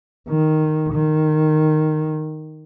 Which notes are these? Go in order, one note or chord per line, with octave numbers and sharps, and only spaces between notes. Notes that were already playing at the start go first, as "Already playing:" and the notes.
D#3
D#3